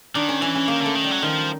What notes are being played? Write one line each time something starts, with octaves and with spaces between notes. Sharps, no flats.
D#3 D4
C#4
E3 C#4
C#4
D#3 A#3
D3 A3
D#3
G3
F#3
D#3 F3